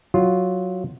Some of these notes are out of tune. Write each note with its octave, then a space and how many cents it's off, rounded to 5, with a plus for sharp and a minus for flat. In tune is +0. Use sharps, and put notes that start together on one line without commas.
F#3 +0 F4 +0